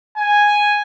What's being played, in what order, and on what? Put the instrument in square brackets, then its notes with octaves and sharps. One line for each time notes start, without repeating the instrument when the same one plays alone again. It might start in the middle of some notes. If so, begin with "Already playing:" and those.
[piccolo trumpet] G#5